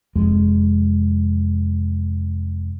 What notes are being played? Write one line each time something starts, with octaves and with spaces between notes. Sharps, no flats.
F1 F2 G#3